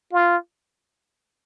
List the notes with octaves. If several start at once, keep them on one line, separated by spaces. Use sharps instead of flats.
F4